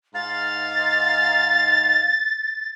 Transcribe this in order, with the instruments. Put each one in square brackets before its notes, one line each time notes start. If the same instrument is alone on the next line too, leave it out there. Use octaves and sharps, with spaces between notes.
[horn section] G#2 F5 [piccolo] A6